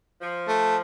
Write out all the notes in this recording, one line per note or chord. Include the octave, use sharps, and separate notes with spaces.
F3
A3